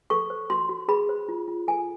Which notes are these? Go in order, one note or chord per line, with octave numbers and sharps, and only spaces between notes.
A4 C#6
C5
F#4 C6
F#4
G#4 B5
C5
F4
F4
A4 G#5